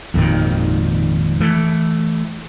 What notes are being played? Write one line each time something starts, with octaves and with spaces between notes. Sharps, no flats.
G#1 F2 A#2 D#3
E3 A3